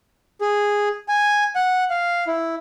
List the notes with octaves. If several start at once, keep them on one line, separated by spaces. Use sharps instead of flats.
G#4
G#5
F#5
F5
E4